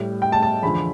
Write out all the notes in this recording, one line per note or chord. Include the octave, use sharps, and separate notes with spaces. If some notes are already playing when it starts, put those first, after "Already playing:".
Already playing: A2 G3
G5
A5
A5
E2 D3 F3 B5